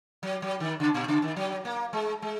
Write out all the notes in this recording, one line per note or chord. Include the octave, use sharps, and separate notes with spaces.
F#3
F#3
D#3
C#3
A#2
C#3
D#3
F#3
A#3
G#3
G#3